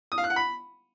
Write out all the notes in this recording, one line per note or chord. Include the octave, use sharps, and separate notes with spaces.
D#6
F5
F#6
F#5
B5